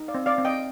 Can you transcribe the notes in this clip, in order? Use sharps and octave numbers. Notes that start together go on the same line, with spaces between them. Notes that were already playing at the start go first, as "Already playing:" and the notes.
Already playing: D#4
D5 F5
C4
D5 F5
C4
D#5 G5